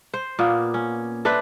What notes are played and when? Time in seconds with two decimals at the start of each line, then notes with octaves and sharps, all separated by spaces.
0.14 C5
0.39 A#2 A#3 B3
0.74 C#4
1.25 A3 D4 B4 C5